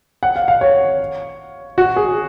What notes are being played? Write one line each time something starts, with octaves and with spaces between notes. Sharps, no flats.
F#5
F5
F5
C#5
F#4
G#4